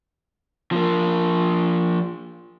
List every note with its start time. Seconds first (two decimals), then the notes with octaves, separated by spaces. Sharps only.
0.72 F3 A#3